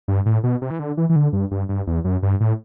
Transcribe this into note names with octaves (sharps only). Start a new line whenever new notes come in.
G2
A2
B2
C3
E3
D3
E3
E3
D3
G2
G2
G2
E2
F#2
G2
A2